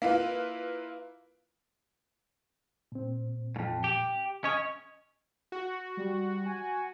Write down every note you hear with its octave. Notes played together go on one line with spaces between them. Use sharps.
A#3 E4 F4 B4
A#2 C4
F2 G#2
G4
C#4 C#5 D#5
F#4
G3
G#5